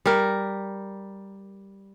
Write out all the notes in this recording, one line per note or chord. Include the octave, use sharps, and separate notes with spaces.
G3 A#4